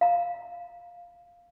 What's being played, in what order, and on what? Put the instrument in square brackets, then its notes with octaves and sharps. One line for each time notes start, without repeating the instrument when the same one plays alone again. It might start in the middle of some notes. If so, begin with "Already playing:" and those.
[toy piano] F5 A#5